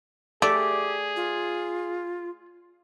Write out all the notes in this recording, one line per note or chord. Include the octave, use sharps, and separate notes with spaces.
A3 G4 G#4 D5
F4